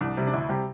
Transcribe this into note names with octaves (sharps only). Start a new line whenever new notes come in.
C2 D4
C3 G3
D4
D2 E4
C3 G3 G4